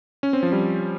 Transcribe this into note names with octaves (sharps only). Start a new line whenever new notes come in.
C#4
C4
F3
G3